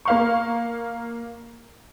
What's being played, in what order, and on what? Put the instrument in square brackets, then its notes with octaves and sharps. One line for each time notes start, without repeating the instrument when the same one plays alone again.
[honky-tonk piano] A#3 F5 C#6